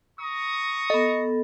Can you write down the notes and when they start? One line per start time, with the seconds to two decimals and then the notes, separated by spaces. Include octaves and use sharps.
0.19 A#5 C#6 D#6
0.90 B3 A4 D#5